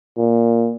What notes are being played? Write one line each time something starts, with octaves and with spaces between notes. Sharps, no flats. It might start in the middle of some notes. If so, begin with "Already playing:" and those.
A#2